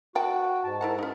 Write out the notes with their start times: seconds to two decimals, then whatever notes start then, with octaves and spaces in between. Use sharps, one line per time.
0.15 F#4 D5 G5 A5
0.64 G#2 A5
0.81 E4 A#4 F#5
0.99 C#4 D#4